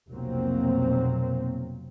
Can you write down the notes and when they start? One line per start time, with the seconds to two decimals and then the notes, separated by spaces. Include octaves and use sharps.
0.11 F1 B1 F#3 A#3 C4